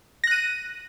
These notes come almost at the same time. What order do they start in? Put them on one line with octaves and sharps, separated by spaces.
A#6 F#6 D#7